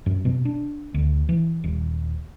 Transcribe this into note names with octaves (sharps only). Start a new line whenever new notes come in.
F#2
B2
D4
D2
E3
D#1